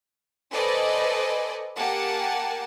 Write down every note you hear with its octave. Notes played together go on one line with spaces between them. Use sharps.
A4 B4 C5 D5 D#5 G#5
A#3 G4 F#5 G#5 A5